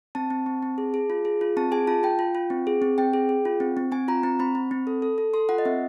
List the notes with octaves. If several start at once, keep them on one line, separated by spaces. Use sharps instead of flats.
C4 A5
C4
C4
C4
G#4
G#4
F4
G#4
F4
C4 A5
G#4 G#5
F4 A5
F4 G5
F4
F4
C4
G#4
C4
C4 G5
G#4
G#4
F4
C4
C4
C4 G#5
F4 A#5
C4 A#5
C4 B5
C4
C4
A4
A4
A4
A4 C6
F4 F#5
D#5
C4 E5